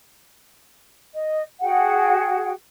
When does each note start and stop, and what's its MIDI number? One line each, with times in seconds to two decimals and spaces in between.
1.14 1.43 75
1.61 2.52 66
1.61 2.52 68
1.61 2.52 78
1.61 2.52 79